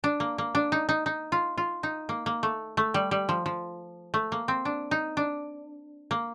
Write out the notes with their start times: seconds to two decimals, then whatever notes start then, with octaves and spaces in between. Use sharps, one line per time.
0.04 D4
0.20 A#3
0.38 A#3
0.55 D4
0.72 D#4
0.89 D#4
1.06 D#4
1.32 F4
1.58 F4
1.83 D#4
2.09 A#3
2.26 A#3
2.43 A3
2.77 A3
2.94 G3
3.11 G3
3.29 F3
3.46 F3
4.14 A3
4.32 A#3
4.48 C4
4.65 D4
4.91 D#4
5.17 D4
6.11 A#3